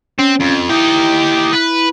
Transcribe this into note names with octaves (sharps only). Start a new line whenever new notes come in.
C4 C#4
F2
D#4 E4 G4
B4